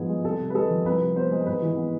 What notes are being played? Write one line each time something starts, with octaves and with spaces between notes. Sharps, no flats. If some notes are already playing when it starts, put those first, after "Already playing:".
Already playing: G#2 F3 B3 G#4
G#3
C2 A4
C3
B4
G#3 A4
F3
C2 B4
C3
B3 C5
G#3
G#2 B4
E3
B3